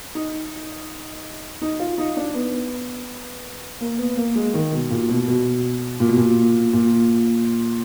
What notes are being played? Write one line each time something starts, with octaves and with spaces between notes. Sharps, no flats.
D#4
D#4
F4
D#4
D4
B3
A#3
B3
A#3
G#3
D#3
B2
A#2
B2
B2
A#2
B2
A#2
A#2